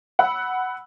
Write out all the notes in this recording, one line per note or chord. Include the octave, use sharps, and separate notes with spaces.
F#5 B5 E6